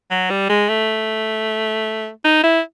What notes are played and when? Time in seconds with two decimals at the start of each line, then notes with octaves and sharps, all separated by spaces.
0.11 F#3
0.30 G3
0.49 G#3
0.69 A3
2.24 D#4
2.44 E4